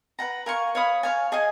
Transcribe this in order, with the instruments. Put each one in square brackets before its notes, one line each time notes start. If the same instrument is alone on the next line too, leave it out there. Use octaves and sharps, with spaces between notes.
[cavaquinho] B4 F#5 A#5
A#4 F5 G#5 C#6
C#5 F5 B5 D#6
C#5 F5 G#5
G#4 D#5 G#5